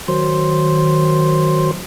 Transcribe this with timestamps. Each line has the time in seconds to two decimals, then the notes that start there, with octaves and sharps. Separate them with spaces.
0.08 D#3 F#3 C5